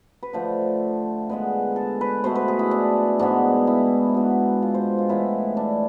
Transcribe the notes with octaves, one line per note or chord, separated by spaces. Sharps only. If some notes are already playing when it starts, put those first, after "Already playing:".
B4
D3 F3 A3 C5
D3 G#3 B3 B4
A4
B4
B2 A3 C5
B4
G#4
E4
D4
G#2 G#3 B3 D4
E4
B2 B3
F4
C5
F4
A2 E3 G#3 B3 E4
D4